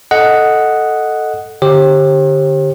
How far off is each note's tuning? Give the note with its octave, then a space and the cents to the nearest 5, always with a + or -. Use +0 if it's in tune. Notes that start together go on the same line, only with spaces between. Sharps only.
A4 +0 D#5 +0 F#5 +0
D3 +5 G4 +0 C5 +45